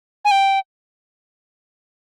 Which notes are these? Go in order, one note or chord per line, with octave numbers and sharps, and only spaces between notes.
G#5
G5